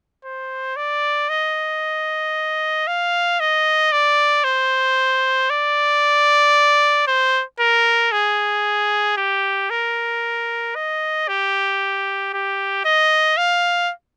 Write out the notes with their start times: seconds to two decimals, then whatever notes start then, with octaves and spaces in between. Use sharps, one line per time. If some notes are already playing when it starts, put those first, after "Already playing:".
0.25 C5
0.76 D5
1.29 D#5
2.87 F5
3.40 D#5
3.92 D5
4.44 C5
5.50 D5
7.07 C5
7.60 A#4
8.12 G#4
9.17 G4
9.70 A#4
10.75 D#5
11.28 G4
12.33 G4
12.85 D#5
13.37 F5